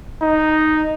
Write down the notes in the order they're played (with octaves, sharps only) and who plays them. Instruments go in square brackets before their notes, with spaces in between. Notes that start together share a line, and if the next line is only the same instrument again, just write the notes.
[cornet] D#4